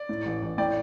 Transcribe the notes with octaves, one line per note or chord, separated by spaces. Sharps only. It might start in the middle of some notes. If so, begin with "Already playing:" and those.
Already playing: D5
A2
A1
A1
A2 D5 G5